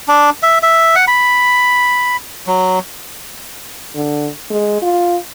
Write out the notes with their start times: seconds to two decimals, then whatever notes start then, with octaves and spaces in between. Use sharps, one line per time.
0.08 D4
0.43 E5
0.63 E5
0.96 F#5
1.07 B5
2.47 F#3
3.95 D3
4.50 G#3
4.82 F4